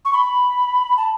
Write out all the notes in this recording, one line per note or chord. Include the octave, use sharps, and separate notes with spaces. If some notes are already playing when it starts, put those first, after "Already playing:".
C#6
B5
A5